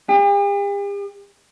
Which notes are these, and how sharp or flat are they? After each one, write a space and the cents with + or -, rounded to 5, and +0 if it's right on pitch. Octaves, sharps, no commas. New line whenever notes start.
G4 +45